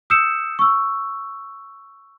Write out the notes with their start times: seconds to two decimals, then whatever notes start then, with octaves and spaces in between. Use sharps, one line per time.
0.10 D#6 E6 G6 C7 C#7 E7
0.59 C#6 E6